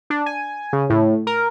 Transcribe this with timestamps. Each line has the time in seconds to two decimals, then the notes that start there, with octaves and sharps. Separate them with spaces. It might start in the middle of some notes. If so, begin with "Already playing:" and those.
0.10 D4
0.26 G#5
0.73 C#3
0.90 A2
1.27 A#4